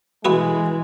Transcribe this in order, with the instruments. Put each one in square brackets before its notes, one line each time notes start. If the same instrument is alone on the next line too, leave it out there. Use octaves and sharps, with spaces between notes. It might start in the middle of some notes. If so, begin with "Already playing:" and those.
[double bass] B2 E3 [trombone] G#3 [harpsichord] A3 B3 F#4